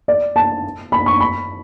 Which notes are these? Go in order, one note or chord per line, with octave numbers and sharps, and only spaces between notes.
D5
A5
B5
C#6
B5